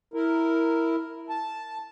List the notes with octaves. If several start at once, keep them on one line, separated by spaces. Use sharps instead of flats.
E4 A#4
A5